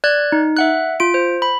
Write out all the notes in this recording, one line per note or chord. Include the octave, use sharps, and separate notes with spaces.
D5 F#6 G#6
D#4
E5 F#5 F#6
F4 D7
C5
B5